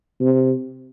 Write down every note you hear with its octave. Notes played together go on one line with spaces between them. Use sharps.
C3